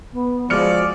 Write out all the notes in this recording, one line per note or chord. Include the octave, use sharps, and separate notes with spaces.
B3
F3 G#3 F#4 D5 F6 C#7